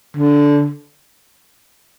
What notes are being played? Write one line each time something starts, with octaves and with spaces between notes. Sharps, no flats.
D3